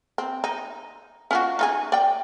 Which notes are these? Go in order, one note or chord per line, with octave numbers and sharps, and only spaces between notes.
C4
D#4
C#4 F4 F#4
D#4 F4 G#4
D5 G5